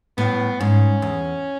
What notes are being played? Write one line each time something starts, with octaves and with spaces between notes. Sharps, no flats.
A2 B3
G#2 C#4
E2